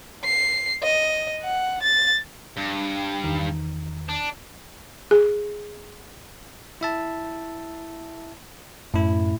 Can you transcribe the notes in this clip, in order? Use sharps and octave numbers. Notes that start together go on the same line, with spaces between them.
C7
D#5
F#5
A6
G2
E2 D#3
D4
G#4
E4 E5 A5
F#2 A2 E4